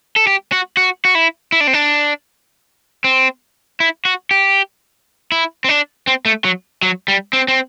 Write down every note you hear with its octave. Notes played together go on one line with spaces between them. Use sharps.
A4
G4
F#4
F#4
F#4
E4
E4
D4
C4
D4
C4
E4
F#4
G4
E4
C4
D4
C4
A3
F#3
F#3
G3
C4
C4